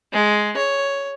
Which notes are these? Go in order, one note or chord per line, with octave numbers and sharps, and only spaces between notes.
G#3
C#5